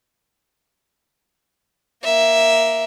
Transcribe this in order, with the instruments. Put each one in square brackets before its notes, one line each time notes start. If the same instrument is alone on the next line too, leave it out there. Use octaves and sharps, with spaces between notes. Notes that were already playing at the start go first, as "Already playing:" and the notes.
[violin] A#3 E5